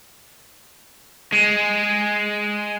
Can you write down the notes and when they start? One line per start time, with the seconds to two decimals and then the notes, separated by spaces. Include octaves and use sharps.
1.33 G#3